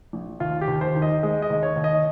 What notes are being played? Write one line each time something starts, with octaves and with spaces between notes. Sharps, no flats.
A#1
D#2 F4
G4
D#2
C5
D#3
D#5
G#3 D#5
D#5
D#2
C#5
D#2
D#5